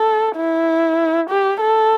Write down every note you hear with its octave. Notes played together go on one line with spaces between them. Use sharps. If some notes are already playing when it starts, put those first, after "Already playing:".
Already playing: A4
E4
G4
A4